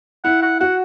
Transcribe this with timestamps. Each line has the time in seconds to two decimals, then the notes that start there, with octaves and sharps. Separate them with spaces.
0.24 E4 F#5
0.42 F#5
0.60 F#4 F#5